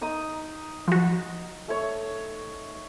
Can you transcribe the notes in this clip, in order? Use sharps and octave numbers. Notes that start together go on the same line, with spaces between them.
D#4 A#5 D#6
F3 F#4
A3 C#5